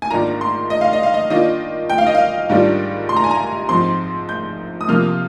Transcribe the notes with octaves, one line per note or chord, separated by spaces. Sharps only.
G#5
G#2 D#3 A#3 D4 F4 A#5
C6
D#5
F5
D#5
F5
D#5
D#3 A#3 D4 F4 D#5
G5
F5
D#5
F5
G#2 D#3 G3 D4 F4
C6
A#5
G#5
A#5
G#2 F3 C4 C6
G6
D#6
C3 F3 A#3 F4 F6